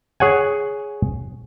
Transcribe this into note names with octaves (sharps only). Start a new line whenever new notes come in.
G#4 C#5 F#5 G#5